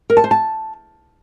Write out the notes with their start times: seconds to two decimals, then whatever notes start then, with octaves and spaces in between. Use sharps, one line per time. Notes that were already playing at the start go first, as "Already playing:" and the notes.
0.10 A#4
0.17 A5
0.24 C5
0.31 A5